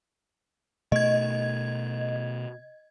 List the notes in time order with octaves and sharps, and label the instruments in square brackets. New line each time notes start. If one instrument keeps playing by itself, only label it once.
[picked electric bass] B2 A3 [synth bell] D#5 G#6